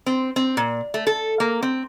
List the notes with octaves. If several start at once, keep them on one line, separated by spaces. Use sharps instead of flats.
C4
C4
A#2
A3
A4
A#3
C4